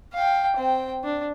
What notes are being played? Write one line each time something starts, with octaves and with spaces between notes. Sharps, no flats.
F5 G5
C4 G5
D4